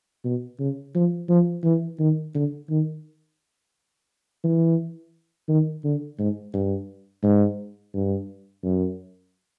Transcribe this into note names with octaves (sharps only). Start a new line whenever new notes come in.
B2
C#3
F3
F3
E3
D#3
D3
D#3
E3
D#3
D3
G#2
G2
G#2
G2
F#2